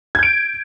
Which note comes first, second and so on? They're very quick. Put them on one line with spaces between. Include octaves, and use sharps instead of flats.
G#6 G6 D7